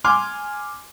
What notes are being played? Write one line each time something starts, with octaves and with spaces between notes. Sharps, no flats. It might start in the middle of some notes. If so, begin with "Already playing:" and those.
G#5 C6 D6 F6